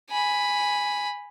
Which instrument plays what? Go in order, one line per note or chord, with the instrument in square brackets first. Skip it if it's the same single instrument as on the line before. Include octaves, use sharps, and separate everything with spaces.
[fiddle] G#5 B5